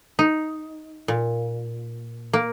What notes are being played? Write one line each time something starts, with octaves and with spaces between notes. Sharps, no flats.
D#4
A#2
A#3